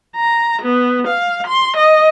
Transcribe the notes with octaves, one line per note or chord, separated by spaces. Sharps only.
A#5
B3
F5
C6
D#5